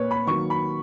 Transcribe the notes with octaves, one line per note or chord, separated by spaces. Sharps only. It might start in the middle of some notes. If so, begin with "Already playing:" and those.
Already playing: A#2 A#3 B4 C#5
B5
D#3 F#3 A#3 C#6
B5